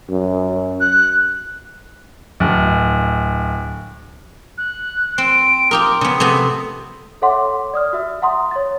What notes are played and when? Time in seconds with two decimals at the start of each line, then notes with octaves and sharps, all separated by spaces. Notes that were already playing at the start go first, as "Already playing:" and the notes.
0.10 F#2
0.81 F#6
2.40 D1
4.58 F#6
5.18 C4 D7
5.71 F4 G4 A#4 D#6
6.01 C#3 B3
6.20 C3 A3 B3
7.22 A4 C#5 E5 F#5 C6 D6
7.73 D5 D#6 F6
7.93 F#4 E5 E6
8.22 E5 F#5 A#5 C6 D#6
8.51 C#5 A6